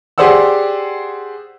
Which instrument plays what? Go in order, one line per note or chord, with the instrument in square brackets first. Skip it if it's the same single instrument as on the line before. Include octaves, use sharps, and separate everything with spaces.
[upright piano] G4 G#4 C5 D5 F#5 E6